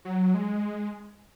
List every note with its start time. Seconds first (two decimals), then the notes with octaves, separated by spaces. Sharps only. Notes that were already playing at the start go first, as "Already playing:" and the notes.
0.05 F#3
0.34 G#3